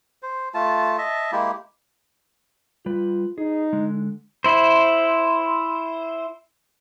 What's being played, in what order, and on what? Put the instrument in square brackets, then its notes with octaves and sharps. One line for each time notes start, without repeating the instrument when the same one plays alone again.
[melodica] C5
A3 F4 A5
D#5 E5 A5
G#3 A#3 E4 G4
[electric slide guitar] G3 B4 [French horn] F4
[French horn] D#4 [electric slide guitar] G#4
[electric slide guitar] D3 G#3
[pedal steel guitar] E4 C5